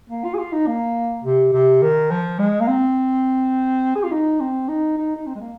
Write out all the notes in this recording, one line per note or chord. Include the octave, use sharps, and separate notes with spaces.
A#3
F4
G#4
F4
D#4
A#3
C3
C3
D#3
F3
G#3
A#3
C4
G#4
F4
D#4
C4
D#4
D#4
D#4
C4
G#3
A#3